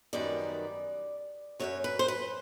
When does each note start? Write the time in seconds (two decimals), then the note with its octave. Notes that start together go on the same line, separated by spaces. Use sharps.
0.13 F#2 D#3 G3 B3 D5
1.60 F#2 D#3 F#3 C#5
1.84 B4
1.99 C5
2.08 B4